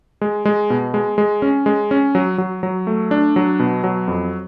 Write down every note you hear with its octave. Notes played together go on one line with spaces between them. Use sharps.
G#3
G#3
B2
G#3
G#3
C#4
G#3
C#4
F#3
F#3
F#3
A3
D4
F#3
B2
F#3
F2